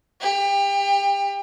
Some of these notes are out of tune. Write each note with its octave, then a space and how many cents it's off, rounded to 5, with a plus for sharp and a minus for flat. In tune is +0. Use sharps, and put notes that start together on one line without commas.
G4 +30